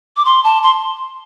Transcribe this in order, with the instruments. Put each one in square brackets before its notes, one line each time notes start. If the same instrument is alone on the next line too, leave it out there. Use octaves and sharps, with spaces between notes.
[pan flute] D6
C6
A5
C6